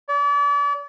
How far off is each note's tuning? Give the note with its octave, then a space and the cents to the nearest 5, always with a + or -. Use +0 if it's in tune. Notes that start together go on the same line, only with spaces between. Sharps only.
D5 -40